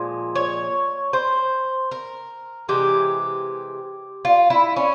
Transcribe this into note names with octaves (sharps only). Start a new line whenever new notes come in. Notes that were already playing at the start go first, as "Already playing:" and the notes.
Already playing: A#2 F3 G#3
C#5
C5
A#4
C3 E3 G#3 G4
F4
E4
C#4